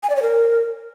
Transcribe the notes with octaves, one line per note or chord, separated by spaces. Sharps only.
G#5
D5
C#5
A#4